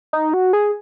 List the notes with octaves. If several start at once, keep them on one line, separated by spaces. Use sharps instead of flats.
D#4
F#4
G#4